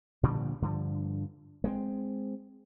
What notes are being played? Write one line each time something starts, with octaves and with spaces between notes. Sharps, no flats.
A#2 D3 F3 G3
G2 D3 F3
G#3 A#3 C4